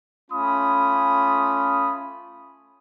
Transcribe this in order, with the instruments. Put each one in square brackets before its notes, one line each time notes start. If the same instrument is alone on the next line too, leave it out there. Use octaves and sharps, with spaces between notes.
[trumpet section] A3 C#4 F4 B5 D#6